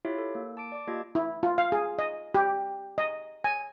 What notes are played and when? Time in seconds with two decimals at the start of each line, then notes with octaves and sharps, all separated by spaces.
0.05 E4 F4 G4 C#5 E5
0.18 A4
0.35 A#3
0.57 A5 D6 D7
0.72 D5 D6
0.87 A#3 F4 G4 D#5 A5 G#6
1.15 E4
1.43 F4
1.58 F5
1.72 G#4
1.99 D#5
2.35 G4
2.98 D#5
3.44 G#5